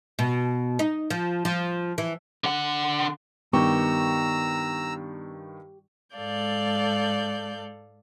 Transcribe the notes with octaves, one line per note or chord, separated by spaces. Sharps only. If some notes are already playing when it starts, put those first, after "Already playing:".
B2
D#4
F3
F3
E3
D3 F#5
G2 D#3 B3 G4 A#5 C#6 E6
G#2 G#3 A4 D5 F5 G6